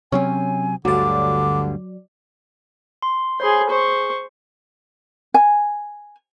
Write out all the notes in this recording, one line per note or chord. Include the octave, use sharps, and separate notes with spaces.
C3 F#3 C4 C#4 G#5
D2 G2 D3 F#3 D5 D6
C6
G#4 C5 C#5 B5 C6
G#4 C5 C#6
G#5